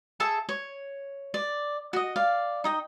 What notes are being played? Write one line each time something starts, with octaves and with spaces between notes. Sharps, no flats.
G#4 A4 E5 A5
C#5
D5
F#4 D#5
D5 F5
D#4 D#5 G5